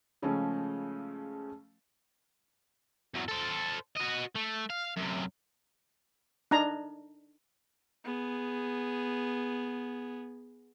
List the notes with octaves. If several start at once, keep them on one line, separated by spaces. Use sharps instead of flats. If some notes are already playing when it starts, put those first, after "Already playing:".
C#3 F3 G#3 A3 C#4
E2 F#3
A4 C5
F#4 D#5
A3
F5
F#2 C3
D4 D#4 A#5
B3 G#4